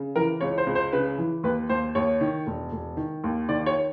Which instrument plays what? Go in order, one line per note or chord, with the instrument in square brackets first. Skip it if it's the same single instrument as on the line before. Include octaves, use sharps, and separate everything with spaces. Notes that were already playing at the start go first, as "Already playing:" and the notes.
Already playing: [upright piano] C#3
E3 A#4
C#2 C#5
C5
C#2
C5
C#3 B4
E3
D#2 B4
D#2 C5
D#2 C#5
D#3
E1
E1
D#3
D#2
D#3 D5
C#5